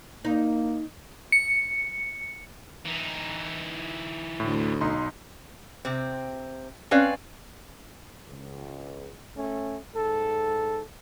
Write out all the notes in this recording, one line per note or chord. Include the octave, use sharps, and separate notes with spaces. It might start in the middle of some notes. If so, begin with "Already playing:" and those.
A#3 D#4
C#7
E3 D#4
D2 A2
B1 D#4 C6
C3 C4
C4 C#4 B4 D5 F5
C#2
A3 C#4
G#2 A4